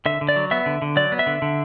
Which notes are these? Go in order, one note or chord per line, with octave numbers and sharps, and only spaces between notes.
D3 E5
D3
D5
F#3
B3 E5
D3
D3
F#3 D5
B3
E5
D3
D3